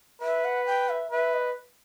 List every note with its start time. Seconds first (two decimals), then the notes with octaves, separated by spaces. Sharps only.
0.22 B4 E5
0.45 F#5
0.66 G5
0.89 E5
1.11 B4 E5
1.33 D#5